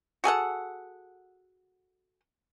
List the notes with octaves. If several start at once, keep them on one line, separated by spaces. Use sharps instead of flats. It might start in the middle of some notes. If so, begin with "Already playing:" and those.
F#4 G#4 A4 F#5